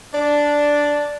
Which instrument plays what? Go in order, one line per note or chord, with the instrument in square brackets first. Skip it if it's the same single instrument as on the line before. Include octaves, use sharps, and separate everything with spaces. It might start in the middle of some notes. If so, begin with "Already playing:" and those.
[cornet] D4 [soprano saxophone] D5